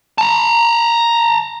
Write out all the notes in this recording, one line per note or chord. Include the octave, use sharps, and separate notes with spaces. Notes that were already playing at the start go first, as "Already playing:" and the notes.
A5 A#5